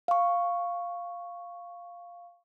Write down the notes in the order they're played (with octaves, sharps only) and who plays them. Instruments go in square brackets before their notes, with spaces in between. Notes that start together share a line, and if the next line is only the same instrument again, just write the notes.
[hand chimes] F5 C#6